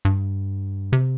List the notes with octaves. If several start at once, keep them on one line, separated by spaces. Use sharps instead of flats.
G2
C3